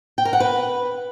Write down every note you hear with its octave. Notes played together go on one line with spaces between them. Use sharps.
G5
A#4
F#5
B4